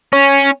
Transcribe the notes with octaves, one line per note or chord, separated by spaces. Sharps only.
C#4